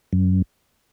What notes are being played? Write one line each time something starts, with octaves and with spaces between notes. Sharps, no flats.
F#2